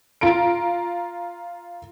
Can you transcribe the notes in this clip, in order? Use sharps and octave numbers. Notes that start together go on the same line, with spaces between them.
F4 A#5 D7